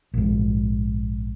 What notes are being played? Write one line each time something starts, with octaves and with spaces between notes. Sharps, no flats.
A#1 G#2